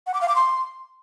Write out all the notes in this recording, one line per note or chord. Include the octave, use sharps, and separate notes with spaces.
F#5
D6
F5
D6
C6